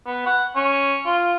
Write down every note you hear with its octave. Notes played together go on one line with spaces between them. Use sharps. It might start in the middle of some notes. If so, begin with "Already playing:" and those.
B3
F#5
C#4
F4